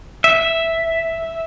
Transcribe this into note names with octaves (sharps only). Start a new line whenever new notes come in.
E5